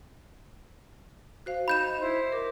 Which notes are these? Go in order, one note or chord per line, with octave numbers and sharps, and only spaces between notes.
F#4 C5 F5
D#4 B5 G6 E7
E4 C5
A#4 D6